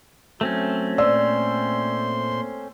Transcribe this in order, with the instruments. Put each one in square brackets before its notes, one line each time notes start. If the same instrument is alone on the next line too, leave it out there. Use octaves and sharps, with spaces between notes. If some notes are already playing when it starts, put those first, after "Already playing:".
[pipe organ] F#3 [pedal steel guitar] A3 C4 C#4
[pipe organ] A#2 C5 C6 [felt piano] D5 E6